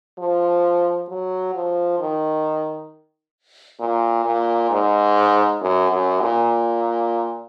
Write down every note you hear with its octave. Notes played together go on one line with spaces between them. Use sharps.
F3
F#3
F3
D#3
A#2
A#2
G#2
F#2
F#2
A#2